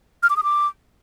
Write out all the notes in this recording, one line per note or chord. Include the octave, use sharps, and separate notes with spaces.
F6
D6
D#6
D6